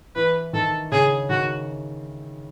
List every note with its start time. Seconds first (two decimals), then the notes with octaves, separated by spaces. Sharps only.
0.15 E3 B4
0.53 D#3 A4
0.92 C#3 G#4
1.29 D#3 F#4